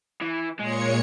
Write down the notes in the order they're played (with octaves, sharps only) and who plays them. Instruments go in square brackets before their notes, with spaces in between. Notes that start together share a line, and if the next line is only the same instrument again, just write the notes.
[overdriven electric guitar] E3
[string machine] A#2 C#5 C#7 [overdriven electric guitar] G#3